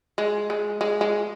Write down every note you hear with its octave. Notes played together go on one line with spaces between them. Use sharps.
G#3
G#3
G#3
G#3